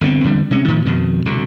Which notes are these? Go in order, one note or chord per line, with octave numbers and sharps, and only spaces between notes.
G1 D3 B3 C4
E2 D3 G3
C3 G#3 C#4
A2 D#3 F3
F2 B2 D#3
C2 B2 D3